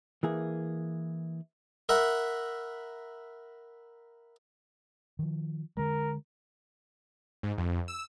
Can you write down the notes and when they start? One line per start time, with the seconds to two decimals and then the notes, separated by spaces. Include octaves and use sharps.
0.23 E3 A#3 G#4
1.89 A#4 E5 F#5 B5
5.19 D#3 F3
5.77 D3 G#3 A#4
7.43 G#2
7.58 F2
7.88 E6